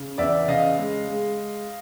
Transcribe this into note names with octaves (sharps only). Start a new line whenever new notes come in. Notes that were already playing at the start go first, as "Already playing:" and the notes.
Already playing: C#3
E2 D5 E5
C#3 D#5 F5
G#3
G#3